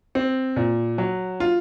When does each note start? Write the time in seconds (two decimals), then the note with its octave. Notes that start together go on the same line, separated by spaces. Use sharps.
0.15 C4
0.56 A#2
0.98 F#3
1.40 F4